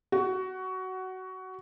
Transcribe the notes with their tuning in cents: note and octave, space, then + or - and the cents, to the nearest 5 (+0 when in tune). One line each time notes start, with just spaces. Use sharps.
F#4 +15